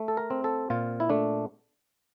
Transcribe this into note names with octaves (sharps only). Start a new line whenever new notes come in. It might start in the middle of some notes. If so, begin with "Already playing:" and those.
Already playing: A3
A4
A#4
C4
A4
A#2 F4
E4
A3 D4